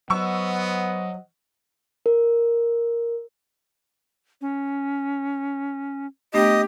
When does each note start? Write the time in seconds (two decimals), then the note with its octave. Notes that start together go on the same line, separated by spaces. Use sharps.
0.10 F#3 B3 C5 D#5 F#5 C#6 E6
2.06 A#4
4.41 C#4
6.34 A3 B3 D4 G4 D#5